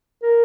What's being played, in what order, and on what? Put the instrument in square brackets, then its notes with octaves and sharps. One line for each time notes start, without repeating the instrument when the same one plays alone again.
[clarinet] A#4